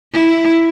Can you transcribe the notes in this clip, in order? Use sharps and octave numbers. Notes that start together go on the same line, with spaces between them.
E4